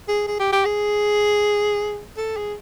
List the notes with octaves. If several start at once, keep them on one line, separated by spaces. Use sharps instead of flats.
G#4
G#4
G4
G4
G#4
A4
G#4